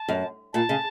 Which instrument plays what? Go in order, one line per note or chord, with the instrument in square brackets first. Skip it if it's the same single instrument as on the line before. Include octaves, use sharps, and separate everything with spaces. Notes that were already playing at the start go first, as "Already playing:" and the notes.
Already playing: [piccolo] A5
[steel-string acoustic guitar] F#2
[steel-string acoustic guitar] A#2 [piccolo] A5
[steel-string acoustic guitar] C#3